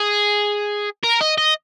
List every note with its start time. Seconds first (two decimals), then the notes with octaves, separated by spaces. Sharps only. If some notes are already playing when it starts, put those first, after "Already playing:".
Already playing: G#4
1.03 A#4
1.21 D#5
1.38 D#5